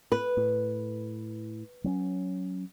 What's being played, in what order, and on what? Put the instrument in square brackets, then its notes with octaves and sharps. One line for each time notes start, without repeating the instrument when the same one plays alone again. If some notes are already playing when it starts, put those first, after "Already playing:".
[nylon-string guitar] B4
[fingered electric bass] A2
F#3 C4 C#4